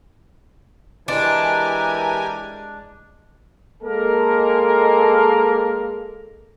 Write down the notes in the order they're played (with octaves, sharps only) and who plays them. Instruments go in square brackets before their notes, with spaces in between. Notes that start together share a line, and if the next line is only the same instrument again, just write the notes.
[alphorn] E3 [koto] G#3 [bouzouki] D4 [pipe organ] G4 A#4 G#5
[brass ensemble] G#3 A#3 A4 A#4